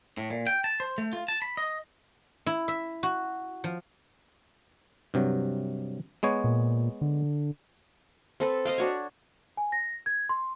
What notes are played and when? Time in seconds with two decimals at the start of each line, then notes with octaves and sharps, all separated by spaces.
0.18 A2
0.30 A#2
0.47 G5
0.64 A5
0.80 C5
0.98 A3
1.13 F4
1.28 A5
1.42 B5
1.57 D#5
2.46 E4
2.68 E5
3.03 F#4
3.64 F3
5.14 G2 C3 F#3
6.23 G#3 B3 C#5
6.44 A#2
7.01 D3
8.40 C4 A4 B4
8.65 C5 D#5 F5 G5
8.78 D4 F#4 C#5
9.57 G#5
9.72 A#6
10.06 G#6
10.29 C6